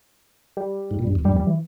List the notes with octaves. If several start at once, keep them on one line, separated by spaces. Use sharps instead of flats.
G3
G#2
A#2
G2
E2
G2 G3
E2
G3
E3